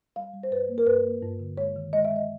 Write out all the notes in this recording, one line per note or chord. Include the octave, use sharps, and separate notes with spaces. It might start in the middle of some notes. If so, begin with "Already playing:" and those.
G3 F5
G3
C5
G2 B4
A#3
A#4
G2 B4
A#3
G2
D3
G#3 C#5
D#3
G#3 D#5
E5
G#3
D#5